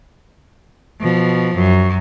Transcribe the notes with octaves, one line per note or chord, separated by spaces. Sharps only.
B2 F3
F#2